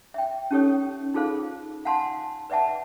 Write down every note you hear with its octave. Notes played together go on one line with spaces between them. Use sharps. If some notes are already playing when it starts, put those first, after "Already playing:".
E5 G5
C#4 D#4 G4 A4 C#5 D#6
D#4 F4 G#4 A4 C5 F5
F5 F#5 G#5 A5 C6
B4 D5 E5 F#5 A5